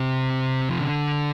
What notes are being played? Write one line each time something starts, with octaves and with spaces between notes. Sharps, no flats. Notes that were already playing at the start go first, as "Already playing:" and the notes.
Already playing: C3
F3
D3